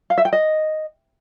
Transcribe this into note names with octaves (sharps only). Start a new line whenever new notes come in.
F5
E5
G5
D#5